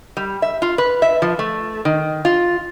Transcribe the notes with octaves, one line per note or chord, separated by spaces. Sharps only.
G3
E5
F4
B4
E5
F3
A3
D#3
F4